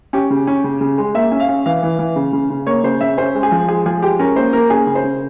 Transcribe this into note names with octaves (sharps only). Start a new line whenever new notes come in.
C#4 G4
C#3
C#4
C#3
C#3
G#3
A#3 E5
C#4
F5
C#4
E3 F5
E3
E3
C#3
C#3
C#3
A#3 C#5
C#3 C5
C#3 E5
C#4 C5
G#3
G#4
F3
G#3 G#4
F3 G#4
G#3 G4
C#4 A#4
A#3 C5
A#3 A#4
C#4 G#4
C#3
C5
C#3